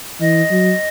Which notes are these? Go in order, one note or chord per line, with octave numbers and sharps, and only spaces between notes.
E3 D#5
F#3